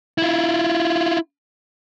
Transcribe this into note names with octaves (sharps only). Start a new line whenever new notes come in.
E4 F4